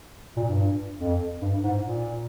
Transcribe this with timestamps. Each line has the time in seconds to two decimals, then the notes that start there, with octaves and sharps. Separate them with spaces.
0.37 A#2
0.47 G2
1.00 F2
1.42 G2
1.64 G#2
1.84 A#2